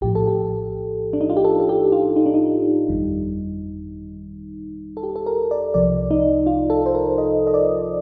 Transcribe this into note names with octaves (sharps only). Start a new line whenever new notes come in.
A#1 A2 F3 G4
A4
G4
D4
D#4
F4
G4
A4
A4
G4
F4
D#4
D4
D#4
G1 F2 D#3 G3
A4
G4
A4
A#4
D5
C2 C3 F3 D5
D#4
F4
A4
C5
A#4
D#5
D#5
D5